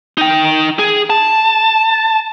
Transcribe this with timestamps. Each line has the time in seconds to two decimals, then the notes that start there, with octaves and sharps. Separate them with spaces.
0.18 D#4 G5
0.79 G#4
1.10 A5